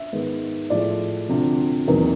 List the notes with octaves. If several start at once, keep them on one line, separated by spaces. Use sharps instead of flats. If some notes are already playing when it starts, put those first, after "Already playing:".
Already playing: E5
G#2 D#3 G#3 B3
A2 F3 G#3 D5
D2 C3 F3
E2 C3 D#3 F#3 A#3